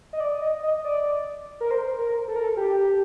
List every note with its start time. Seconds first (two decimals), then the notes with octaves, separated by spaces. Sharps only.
0.13 D#5
0.20 D5
0.41 D#5
0.63 D#5
0.85 D5
1.61 A#4
1.71 C5
1.99 A#4
2.28 A4
2.36 A#4
2.44 A4
2.57 G4